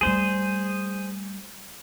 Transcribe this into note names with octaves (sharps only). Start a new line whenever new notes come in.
G3 A3 G#4 C5